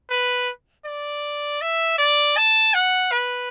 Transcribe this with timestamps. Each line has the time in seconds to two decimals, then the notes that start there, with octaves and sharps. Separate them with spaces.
0.10 B4
0.85 D5
1.61 E5
1.98 D5
2.37 A5
2.74 F#5
3.11 B4